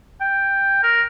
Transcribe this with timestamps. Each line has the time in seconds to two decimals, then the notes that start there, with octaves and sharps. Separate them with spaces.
0.21 G5
0.83 A#4